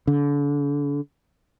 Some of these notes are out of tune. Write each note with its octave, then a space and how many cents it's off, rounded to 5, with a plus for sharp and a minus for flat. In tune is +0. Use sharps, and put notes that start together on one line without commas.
D3 -35